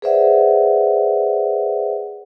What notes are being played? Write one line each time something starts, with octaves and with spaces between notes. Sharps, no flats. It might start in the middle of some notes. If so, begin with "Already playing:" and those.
G#4 B4 C5 D5 E5 F#5